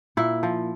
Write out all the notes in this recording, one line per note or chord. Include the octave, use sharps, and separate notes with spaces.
A#2 E4
F3